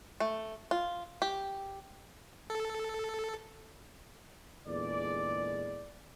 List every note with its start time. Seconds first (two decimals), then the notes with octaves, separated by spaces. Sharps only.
0.20 A3
0.71 F4
1.22 G4
2.50 A4
4.67 E2 A#2 D3 G#3 D5